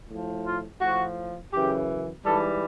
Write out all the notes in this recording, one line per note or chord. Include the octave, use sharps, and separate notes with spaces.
A2 F3
F4
A2 F3 F#4
F#2 C#3 E3 G4
G#2 E3 G3 A4